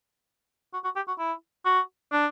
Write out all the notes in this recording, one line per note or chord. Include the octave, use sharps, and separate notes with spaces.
F#4
F#4
G4
F#4
E4
F#4
D4